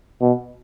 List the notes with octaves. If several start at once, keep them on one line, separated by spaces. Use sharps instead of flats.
B2